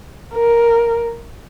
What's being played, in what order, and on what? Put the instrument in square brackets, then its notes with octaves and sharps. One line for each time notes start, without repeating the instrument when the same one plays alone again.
[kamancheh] A#4